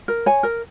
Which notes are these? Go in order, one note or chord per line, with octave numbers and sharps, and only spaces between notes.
A#4
C#5 G#5
A#4